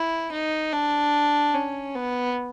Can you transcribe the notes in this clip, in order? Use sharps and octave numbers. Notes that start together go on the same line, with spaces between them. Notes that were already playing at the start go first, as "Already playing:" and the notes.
Already playing: E4
D#4
D4
C#4
B3